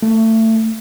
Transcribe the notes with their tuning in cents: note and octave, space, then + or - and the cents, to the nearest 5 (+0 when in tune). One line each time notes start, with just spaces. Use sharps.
A3 +25